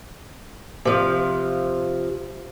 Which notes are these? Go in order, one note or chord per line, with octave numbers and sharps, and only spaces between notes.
C3 F3 F5